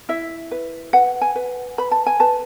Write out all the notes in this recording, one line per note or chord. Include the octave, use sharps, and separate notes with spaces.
E4 E5
B4
B4 F#5
G#5
B4
B4 B5
A5
G#5
B4 A5